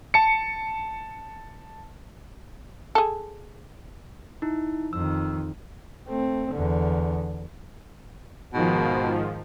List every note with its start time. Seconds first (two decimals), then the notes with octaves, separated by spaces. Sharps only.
0.14 A5 C#7
2.95 G#4 A4
4.42 D#4 E4
4.93 F2 D#3 E6
6.09 A3 C4
6.50 E2 D3
8.54 G#2 B2 D#3 F3